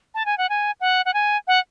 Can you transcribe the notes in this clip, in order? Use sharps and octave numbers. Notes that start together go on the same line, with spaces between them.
A5
G#5
F#5
G#5
F#5
F#5
G#5
F#5